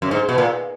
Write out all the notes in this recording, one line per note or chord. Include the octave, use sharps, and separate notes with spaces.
F#2
G#2
B2
A#2